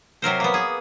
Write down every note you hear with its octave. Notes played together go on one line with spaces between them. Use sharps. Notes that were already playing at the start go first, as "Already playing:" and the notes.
C3 F#3 A#4 C5
A#3 B3
G#4